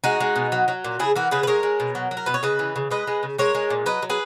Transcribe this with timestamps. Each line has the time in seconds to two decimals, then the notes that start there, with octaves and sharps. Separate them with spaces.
0.04 G#3 D#4 F#4
0.20 G#3
0.36 B2
0.52 F#3
0.68 F#3
0.85 A#2
1.00 C#3 E4 G#4
1.15 E3 F#4 A#4
1.31 C#3 G#4 B4
1.43 B4
1.47 G#3 A#4 C#5
1.63 G#3
1.80 B2
1.95 F#3
2.11 F#3
2.17 A#4
2.26 B2 B4
2.34 C#5
2.43 C#3 B4 D#5
2.59 E3
2.76 C#3
2.90 G#3 B4 D#5
3.07 G#3
3.23 C#3
3.38 G#3 A#4 C#5
3.55 G#3
3.70 A#2
3.86 F#3 B4 D#5
4.02 F#3
4.10 G#4 B4